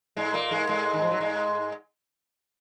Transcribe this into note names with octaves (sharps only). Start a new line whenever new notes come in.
G#2 G#3
A#2 A#3
G#2 G#3
G#2 G#3
D#3
F3
F#3
G#2 G#3